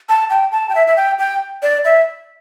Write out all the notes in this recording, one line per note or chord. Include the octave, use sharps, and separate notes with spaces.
A5
G5
A5
G5
E5
E5
G5
G5
D5
E5